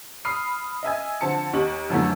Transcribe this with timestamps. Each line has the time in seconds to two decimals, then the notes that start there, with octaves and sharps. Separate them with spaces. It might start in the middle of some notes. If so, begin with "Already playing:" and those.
0.25 B5 D#6 F6 C7
0.83 D#5 E5 G#5 G#6
1.21 D3 F3 C4 A5 C#7
1.53 D#2 G4 D#5 C#6 F#7
1.90 A#1 F#2 D3 E3 F#3 A3